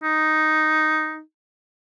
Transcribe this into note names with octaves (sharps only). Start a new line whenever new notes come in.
D#4